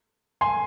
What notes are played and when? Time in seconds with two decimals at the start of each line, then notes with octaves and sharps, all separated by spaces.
0.41 G#5 C6